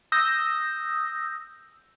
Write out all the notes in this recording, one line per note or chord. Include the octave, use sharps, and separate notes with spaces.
D#6 E6 G6 A#6